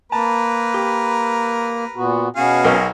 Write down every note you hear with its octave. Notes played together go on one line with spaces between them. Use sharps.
A#3 A#4 B4 A5
G4
A#2 B3 F#4
B2 B3 C#4 F#4 G#4 F5
B1 A#4 D#5